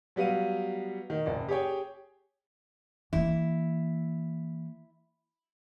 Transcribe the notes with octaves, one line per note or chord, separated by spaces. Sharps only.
F#3 G3 B3 F5 D#7
D#3
F#1 D5
G4 G#4 C#5 G5
E3 A#3 E4